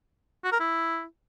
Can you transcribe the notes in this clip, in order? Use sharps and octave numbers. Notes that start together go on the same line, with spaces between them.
F#4
A#4
E4